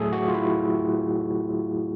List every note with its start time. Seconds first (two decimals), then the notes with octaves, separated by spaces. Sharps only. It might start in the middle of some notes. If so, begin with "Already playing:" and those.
Already playing: A2 F#3 A3 G#4 A4
0.12 F#4
0.28 F4
0.34 E4